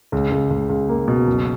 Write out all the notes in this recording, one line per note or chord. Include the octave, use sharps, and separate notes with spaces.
C#2
C#2
C#2
C#2
A#3
B2
F#1